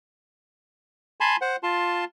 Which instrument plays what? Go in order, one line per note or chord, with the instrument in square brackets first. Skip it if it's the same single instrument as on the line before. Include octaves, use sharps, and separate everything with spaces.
[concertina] G#5 A5 B5 C6
C5 F#5
F4 A5 C6